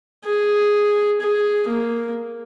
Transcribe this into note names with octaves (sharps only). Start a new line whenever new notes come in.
G#4
G#4
A#3